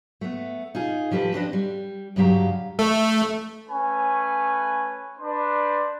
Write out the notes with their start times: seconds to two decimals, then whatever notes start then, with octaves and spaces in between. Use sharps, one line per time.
0.21 A3 B3
0.75 D#4 F4 G#4
1.11 C#3 F3 G4 A4 B4
1.32 C4 D4 B4 D#5
1.53 G3
2.16 G2 C#3 F#3 G4 F5 A#5
2.79 A3
3.69 A3 C#4 B4 G#5
5.19 D4 B4 C5 D5